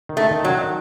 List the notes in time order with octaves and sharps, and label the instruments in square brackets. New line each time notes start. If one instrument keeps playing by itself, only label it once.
[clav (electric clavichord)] D#3
[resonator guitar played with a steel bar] A3
[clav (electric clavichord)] D#3
[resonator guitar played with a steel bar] F#3
[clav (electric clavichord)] D#3